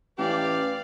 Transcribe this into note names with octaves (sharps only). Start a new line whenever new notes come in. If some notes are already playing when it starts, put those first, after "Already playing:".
A1 G4 B4 D5 F5